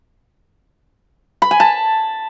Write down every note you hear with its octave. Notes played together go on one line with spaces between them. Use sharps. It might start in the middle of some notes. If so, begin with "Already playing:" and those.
B5
G#5
A5